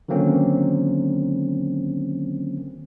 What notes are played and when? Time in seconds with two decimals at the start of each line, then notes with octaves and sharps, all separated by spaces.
0.08 D3 D#3 F#3 A#3 C4 C#4